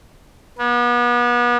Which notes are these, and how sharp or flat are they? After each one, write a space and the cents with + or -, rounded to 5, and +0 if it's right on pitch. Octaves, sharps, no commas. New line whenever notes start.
B3 -35